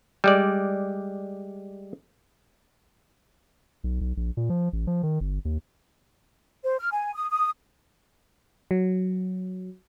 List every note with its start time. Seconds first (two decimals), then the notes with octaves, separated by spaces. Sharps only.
0.24 G3 G#3 D5
3.84 B1
4.01 B1
4.17 A#1
4.37 A#2
4.50 F3
4.73 A1
4.87 F3
5.03 D#3
5.21 G1
5.45 D#2
6.64 C5
6.79 F6
6.92 G#5
7.15 D#6
7.30 D#6
8.71 F#3